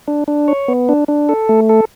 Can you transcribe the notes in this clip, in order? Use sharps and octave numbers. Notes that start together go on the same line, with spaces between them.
D4
D4
C#5
B3
D4
D4
A4
A3
A4